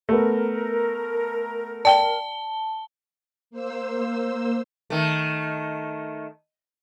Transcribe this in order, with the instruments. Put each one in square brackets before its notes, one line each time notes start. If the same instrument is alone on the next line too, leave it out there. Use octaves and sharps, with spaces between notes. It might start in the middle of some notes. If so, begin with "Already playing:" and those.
[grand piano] A3 B3 [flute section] A#4
[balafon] D5 G5 [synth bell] A5 G7
[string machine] A#3 C5 E6
[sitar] D#3 A3